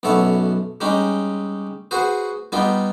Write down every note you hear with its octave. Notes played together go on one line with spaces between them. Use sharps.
B1 F#2 B3 A4 C#5 E5
G3 G#3 C#4 D#4 G4
F#4 G#4 B4 C5
G3 B3 D#4 F4 G4